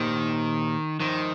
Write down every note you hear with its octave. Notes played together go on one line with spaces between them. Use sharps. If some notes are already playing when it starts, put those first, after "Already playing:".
Already playing: A#2 D#3 A#3 G4 C5
D#3 F3 D#4 C5